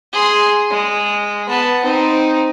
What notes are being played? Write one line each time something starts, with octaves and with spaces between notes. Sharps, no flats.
G#4 C6
G#3
B3 A5
C4 D#4